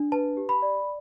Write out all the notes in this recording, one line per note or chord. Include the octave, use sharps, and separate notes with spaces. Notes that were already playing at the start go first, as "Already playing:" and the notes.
Already playing: D4
B4 A5
G4
B5
D5